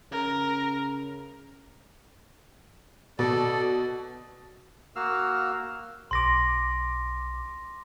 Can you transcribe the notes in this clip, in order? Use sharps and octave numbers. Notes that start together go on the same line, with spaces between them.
C#3 A#4
B2 A4 D5
A#3 F#4 F5 E6 F6
B1 C6 D6 A#6